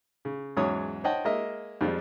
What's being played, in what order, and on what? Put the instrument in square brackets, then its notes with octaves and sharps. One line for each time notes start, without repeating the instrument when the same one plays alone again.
[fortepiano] C#3
E2 G#2 F#3 C#4 C#5 D#6
C5 C#5 D#5 F#5 G5 A5
G#3 A#3 A#4 D#5 E5
F2 F3 G3 G#3